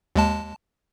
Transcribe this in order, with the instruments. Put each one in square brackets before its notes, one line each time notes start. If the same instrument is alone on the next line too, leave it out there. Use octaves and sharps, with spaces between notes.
[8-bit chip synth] D#2 G#3 A5